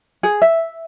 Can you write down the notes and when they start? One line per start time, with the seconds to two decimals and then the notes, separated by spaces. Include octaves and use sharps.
0.23 G#4
0.42 E5